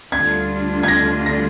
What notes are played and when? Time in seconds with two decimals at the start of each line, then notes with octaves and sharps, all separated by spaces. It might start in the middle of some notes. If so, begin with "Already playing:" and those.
0.12 D2 D3 G3 D4 F4 G#6
0.83 G#6
0.88 A#6
1.26 A#6